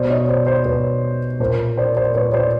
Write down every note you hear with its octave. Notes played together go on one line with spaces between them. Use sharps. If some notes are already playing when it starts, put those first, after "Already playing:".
Already playing: B2 C5 D5
C#5 D#5
C5 D5
C5 D5
B2 B4 C#5
A#2 A#4 C5
C5 D5
C5 D5
A#2 B4 C#5
C5 D5